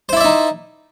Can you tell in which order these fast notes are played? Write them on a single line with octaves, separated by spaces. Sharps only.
C5 E4 D5 E5 D#4